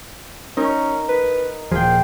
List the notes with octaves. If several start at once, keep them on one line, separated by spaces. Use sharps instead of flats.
C#4 D#4 A#4
B4
D#1 F3 F4 G#4 G5